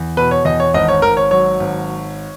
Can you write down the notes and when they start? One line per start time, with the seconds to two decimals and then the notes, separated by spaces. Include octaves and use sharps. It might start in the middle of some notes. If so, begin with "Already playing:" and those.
Already playing: E2
0.17 B2 B4
0.31 C#5
0.45 E2 D#5
0.60 C#5
0.74 G#1 D#5
0.88 C#5
1.02 G#1 A#4
1.17 C#5
1.31 F#3 C#5
1.60 G#1